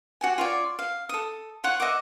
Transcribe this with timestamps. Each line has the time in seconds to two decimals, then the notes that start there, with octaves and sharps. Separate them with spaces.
0.21 F#4 G4 G#5
0.38 F4 C#5 D5
0.79 F5
1.09 A4 D#6
1.64 F4 C#5 F#5
1.80 D#5 E5 F#5 D6